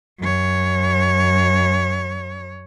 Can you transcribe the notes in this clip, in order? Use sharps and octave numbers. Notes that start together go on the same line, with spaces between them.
F#2 C#5